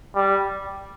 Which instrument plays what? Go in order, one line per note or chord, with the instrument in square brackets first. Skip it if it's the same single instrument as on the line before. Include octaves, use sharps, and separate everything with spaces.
[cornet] G3